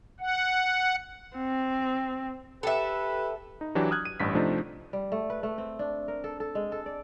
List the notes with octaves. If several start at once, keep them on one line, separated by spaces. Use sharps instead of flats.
F#5
C4
G4 A4 B4 E5
D#4
E3 F#3 D4 F#4 G4
D#6 F6 F#6 G#6
D#7
A1 G2 B6
C3 F3 A3 C4 D4 D#4
G3
A3
B4
A3
C4
D4
A#4
A4
A4
G#3
A4
D5